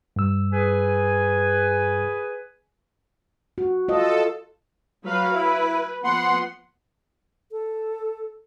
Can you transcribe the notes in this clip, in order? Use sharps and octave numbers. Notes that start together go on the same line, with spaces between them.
G2 E6
G#4 B4 G#5
F#4
F4 A4 D#5
F#3 B4 F5
E4 B4
F3 B3 F#5 C6
A4